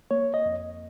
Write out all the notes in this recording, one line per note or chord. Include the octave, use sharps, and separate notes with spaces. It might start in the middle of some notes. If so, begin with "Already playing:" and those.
A#3 C#5
D#5
F2